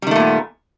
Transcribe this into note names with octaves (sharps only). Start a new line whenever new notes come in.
A#2 D#3 G3 A3 B3